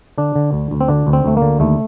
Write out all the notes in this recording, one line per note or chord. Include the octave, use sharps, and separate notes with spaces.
D3 D4
D3
D2
D2
C4
D3 D4
D2
C4
D2 A3
D3 A#3
D#2 A3